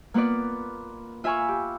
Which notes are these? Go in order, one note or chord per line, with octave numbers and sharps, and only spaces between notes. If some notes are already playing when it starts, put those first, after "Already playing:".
A#3 B3 F4 B4 D5
F4 E5 F5 G#5 B5 C#6
G4